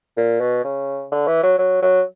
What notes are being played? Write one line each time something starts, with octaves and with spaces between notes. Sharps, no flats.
A#2
B2
C#3
D3
E3
F#3
F#3
F#3